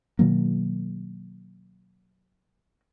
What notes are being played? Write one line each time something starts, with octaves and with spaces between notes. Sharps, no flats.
B2 D#3 F#3 A#3